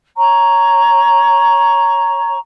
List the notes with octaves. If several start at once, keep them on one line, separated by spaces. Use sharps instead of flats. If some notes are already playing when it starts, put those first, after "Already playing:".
C#5 A#5 C#6